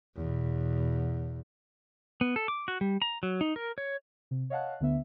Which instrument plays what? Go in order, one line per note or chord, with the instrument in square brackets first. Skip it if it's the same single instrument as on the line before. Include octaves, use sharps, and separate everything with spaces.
[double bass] E2 B2
[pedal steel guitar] B3
A4
D6
F#4
G3
A#5
F#3
D#4
A#4
C#5
[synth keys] C3
C#5 D#5 F5 F#5 A5 F#6
D2 D3 B3 E5